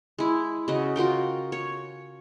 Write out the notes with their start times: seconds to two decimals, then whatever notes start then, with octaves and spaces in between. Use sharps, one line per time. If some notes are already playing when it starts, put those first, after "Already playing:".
0.18 G#3 E4
0.68 C#3 F#4 D#5
0.96 F4 F#4 A#4 G5
1.52 C#5